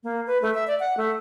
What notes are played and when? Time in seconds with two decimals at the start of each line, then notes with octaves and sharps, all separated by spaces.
0.03 A#3
0.27 B4
0.42 A3
0.54 E5
0.67 D5
0.80 F#5
0.97 A3